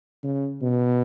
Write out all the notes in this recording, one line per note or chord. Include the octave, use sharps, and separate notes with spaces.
C#3
B2